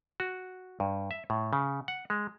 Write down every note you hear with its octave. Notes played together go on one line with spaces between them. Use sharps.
F#4
G2
E5
A2
C#3
F#5
G#3